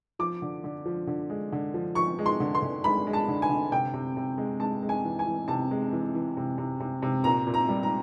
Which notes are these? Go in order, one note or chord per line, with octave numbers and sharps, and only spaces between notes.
F3 D6
D3
D3
F3
D3
G#3
D3
F3
F3 C#6
G#3
C6
D3
C6
D3
G#3 B5
G#3
A5
D3
G#5
D3
C3 G5
C3
C3
G#3
G#3 A5
G#3
G#5
E3
G#5
E3
C3 A5
G#3
E3
E3
C3
C3
C3
C3
A#2 A#5
A#2
A#5
G3
A#5